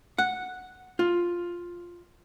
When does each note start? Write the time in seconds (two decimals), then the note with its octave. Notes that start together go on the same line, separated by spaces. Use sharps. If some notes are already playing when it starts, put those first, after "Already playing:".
0.18 F#5
0.99 F4